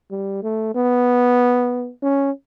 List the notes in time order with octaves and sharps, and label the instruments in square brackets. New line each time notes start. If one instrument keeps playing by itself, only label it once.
[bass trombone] G3
A3
B3
C#4